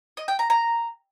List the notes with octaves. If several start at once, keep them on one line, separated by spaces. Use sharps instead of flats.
D#5
G5
A#5
A#5